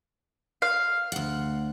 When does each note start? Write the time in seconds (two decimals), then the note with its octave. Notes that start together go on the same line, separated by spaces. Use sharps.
0.62 F5
1.12 D2 F#5